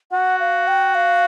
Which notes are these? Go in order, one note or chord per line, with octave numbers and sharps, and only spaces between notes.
F#4 F#5
F5
G5
F5